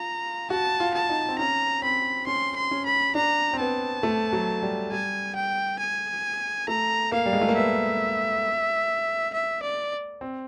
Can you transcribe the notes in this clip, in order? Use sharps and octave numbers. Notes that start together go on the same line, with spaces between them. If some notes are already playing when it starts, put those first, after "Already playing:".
Already playing: F4 A#5
F#4 A5
F4
A5
D#4
C4
C#4 A#5
C4 B5
C#4 C6
C6
C#4
B5
D4 A#5
C4
B3 A5
A3
F#3
G3
G3 G#5
G5
G#5
A3 A#5
A#3 F5
G3
G#3
A3
A#3
B3 E5
E5
D5
C4